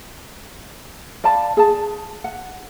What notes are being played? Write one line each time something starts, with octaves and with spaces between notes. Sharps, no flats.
D5 F5 A5 B5
G#4 A5
F#5